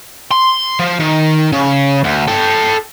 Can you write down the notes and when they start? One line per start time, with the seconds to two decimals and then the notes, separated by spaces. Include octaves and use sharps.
0.31 C6
0.80 F3
1.00 D#3
1.52 C#3
2.04 D2
2.28 A4 G5